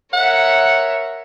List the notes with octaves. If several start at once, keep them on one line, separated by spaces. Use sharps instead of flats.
A#4 C#5 E5 F#5